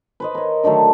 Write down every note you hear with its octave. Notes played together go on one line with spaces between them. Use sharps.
B4 C5 D#5
A#4 C#5
D3 D#3 F#3 A3